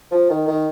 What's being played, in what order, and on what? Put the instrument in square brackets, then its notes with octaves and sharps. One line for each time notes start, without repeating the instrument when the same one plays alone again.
[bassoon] F3
D#3
D#3